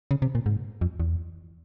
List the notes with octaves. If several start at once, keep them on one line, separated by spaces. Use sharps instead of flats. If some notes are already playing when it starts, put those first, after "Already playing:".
C#3
C3
A#2
G#2
F2
E2